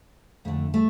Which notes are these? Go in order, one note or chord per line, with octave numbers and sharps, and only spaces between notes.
F2 D3 A3
A3